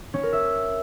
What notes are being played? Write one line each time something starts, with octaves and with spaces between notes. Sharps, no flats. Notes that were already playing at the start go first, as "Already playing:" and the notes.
C#4
A#4
E5